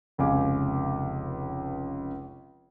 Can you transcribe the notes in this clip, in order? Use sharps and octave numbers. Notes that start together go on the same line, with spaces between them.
F1 C#2 F5 G#5 D6